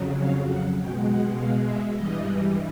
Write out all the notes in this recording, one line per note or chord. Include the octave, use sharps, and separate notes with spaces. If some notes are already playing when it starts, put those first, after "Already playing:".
Already playing: F2 C#3 F#3
F5
F#5
B2 G#3 G5
F#5
F5
E5
G2 E3 G3 D#5